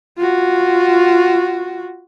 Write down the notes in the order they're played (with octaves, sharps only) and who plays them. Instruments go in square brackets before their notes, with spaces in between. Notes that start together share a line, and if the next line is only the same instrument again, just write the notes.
[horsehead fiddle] F4 F#4